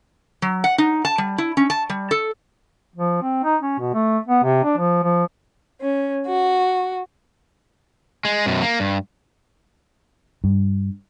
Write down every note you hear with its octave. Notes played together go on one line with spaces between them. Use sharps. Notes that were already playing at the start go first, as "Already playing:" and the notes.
F#3
F#5
D#4
A5
G3
E4
C#4
A5
G3
A4
F3
C4
D#4
C#4
B2
A3
B3
C3
D4
F3
F3
C#4
F#4
G#3
F#2 B2
A#3
G2
G2